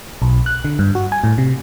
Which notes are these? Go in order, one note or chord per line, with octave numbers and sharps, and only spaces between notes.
B1
F#6
D3
G2
F#4
G#5
A2
C3